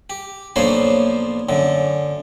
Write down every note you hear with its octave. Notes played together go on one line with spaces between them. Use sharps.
G4
B1 F3 A#3 D4 C5 C#5
F#2 D3